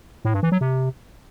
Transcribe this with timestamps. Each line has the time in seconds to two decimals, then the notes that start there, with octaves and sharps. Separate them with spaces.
0.25 A2
0.34 G2
0.43 E3
0.52 F#3
0.61 C3